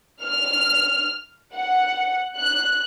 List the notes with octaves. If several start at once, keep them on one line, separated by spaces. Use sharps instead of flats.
F6
F#5
F#6